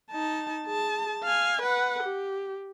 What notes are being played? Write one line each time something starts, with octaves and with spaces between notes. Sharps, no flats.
D#4 A5
G#4 A5
F5 G#5
B4 F#5
G4